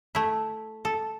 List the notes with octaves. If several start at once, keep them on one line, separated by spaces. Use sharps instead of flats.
A3 E4
A4